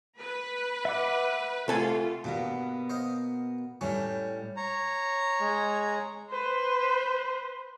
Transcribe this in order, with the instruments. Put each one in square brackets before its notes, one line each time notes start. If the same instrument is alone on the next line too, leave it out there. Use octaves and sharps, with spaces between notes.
[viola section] B4
[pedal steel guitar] E5 F#5 D6
[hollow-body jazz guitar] C2 A4 G#5 [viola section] A3 F4
[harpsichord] G2 [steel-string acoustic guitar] B2 A#3 B3
[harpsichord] C5 D#5 F5
[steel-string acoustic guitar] A2 G3 [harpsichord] E3 C#4
[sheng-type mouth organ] C#5 A#5
[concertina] G#3
[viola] B4 C5